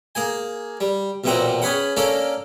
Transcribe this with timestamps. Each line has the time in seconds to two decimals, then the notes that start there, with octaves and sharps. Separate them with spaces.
0.15 A#3 G#4 G#5
0.81 G3
1.24 B1 E2 A#2 C4 F#5 A#5
1.62 C#4 G#4 B4 F#5
1.97 A#3 C#4 D4 A4 A#4